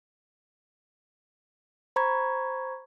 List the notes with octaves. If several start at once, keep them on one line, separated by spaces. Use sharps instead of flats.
C5 A#5 B5 C#6 G#6